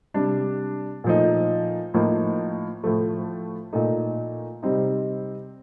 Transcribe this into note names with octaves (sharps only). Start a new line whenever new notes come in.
C3 G3 D4
A#2 F3 A3 D#4
A2 F3 A#3 D#4
A2 F3 A3
A#2 A3 D#4
C3 G3 C4 D#4